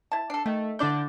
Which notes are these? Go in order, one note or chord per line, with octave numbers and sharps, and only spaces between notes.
E4 A5
D4 A4 C7
D#3 A3
D3 D4 E4 D5 G6